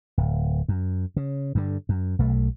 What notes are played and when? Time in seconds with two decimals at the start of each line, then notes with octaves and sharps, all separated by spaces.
0.18 D1
0.69 F#2
1.16 C#3
1.55 G2 D3
1.89 F#2
2.19 B1 A3